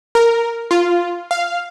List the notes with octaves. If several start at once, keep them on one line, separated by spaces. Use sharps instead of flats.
A#4
F4
F5